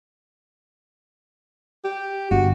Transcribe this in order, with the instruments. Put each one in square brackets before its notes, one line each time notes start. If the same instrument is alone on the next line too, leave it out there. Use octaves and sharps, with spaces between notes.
[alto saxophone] G4
[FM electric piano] G1 [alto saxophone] F#4